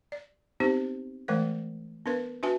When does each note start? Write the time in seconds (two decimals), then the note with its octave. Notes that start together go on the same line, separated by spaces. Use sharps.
0.12 D5
0.60 B3 C4 D#4 G4 C5
1.28 E3 G#3 A3 A#4 C5
2.06 B3 D4 A#4 B4
2.43 D4 F#4 B4 E5 G#5 A5